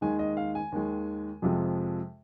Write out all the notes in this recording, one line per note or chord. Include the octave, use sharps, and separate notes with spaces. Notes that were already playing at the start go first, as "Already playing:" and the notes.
D#2 D#3 G#3 G#5
D#5
F5
G#5
D#2 D#3 G#3
F2 C3 F3 G#3